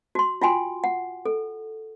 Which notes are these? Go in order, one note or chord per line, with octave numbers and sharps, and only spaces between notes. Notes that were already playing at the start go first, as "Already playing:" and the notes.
F#4 C6
F4 F#4 G5 G#5 C6
F#5
A4